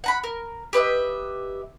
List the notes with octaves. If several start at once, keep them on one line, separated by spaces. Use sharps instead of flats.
F#5 A#5 B5
A#4
G4 B4 D#5 E5